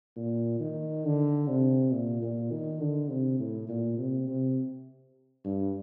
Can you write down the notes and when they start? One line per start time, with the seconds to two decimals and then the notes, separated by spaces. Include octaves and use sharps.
0.16 A#2
0.60 D#3
1.05 D3
1.48 C3
1.92 A#2
2.22 A#2
2.51 D#3
2.80 D3
3.10 C3
3.39 A2
3.69 A#2
3.98 C3
4.28 C3
5.44 G2